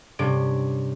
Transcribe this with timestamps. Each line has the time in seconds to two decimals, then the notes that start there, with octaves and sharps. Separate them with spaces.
0.19 G2 C3 C#4 D7